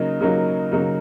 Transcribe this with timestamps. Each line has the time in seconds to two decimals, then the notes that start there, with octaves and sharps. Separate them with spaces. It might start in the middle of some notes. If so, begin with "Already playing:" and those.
Already playing: C#3 F#3 A#3 D#4
0.21 C#3 F#3 A#3 D#4
0.72 C#3 F#3 A#3 D#4